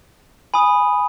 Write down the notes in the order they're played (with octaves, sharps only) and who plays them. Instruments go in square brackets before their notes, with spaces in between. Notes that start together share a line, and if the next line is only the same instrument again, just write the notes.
[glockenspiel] G#5 B5 D#6